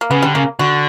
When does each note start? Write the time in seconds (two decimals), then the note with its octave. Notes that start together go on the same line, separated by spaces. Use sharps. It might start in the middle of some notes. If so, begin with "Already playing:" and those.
0.01 A#3
0.11 C#3 B3
0.22 D3 G3
0.35 C#3 A#3
0.59 D3 F#4